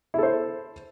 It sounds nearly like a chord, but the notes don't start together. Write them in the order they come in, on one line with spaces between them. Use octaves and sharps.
E4 A4 C5